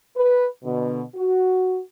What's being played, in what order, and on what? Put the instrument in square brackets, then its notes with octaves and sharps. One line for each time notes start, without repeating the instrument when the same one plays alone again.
[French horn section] B4
B2 D3
F#4